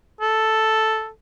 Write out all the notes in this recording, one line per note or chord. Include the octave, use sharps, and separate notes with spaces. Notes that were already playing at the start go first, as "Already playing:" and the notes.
A4